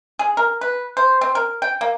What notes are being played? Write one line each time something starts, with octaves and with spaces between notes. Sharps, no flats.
G#4
A#4
B4
C5
C4
A#4
G5
A#3